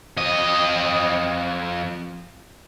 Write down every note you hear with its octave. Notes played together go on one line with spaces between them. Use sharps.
F2 D#5